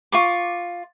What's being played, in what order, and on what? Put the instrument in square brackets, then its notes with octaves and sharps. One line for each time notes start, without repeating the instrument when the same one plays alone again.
[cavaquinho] F4 C#6 D6